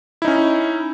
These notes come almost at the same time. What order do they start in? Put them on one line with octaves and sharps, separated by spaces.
E4 D#4 C#4